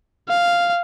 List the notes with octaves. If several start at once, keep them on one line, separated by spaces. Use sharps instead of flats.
F5